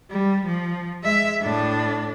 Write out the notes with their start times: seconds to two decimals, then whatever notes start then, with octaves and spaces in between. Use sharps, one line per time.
0.11 G3
0.46 F3
1.03 G#3 E5
1.41 A2 D4